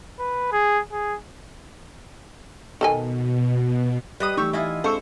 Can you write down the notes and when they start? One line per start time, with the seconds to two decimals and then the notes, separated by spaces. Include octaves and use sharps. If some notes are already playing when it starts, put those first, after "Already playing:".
0.19 B4
0.52 G#4
0.92 G#4
2.81 B2 D#3 A4 G#5
4.20 G3 B4 D#5 D#6
4.37 E3 A3 D#4 G4 C#6 E6
4.53 E4 F4 D#5 G#5
4.84 G#3 C4 D4 A4 C5 F5 C#6 E6